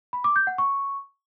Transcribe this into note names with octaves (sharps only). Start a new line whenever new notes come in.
B5
D6
G6
F#5
C#6